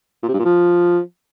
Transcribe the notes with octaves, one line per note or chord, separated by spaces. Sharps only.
A#2
C3
G2
A#2
F3